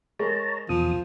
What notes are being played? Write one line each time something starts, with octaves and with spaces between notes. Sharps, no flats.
G#3 G#4 A#4 C#5 A5 A#5
E2 B2 F3 D#6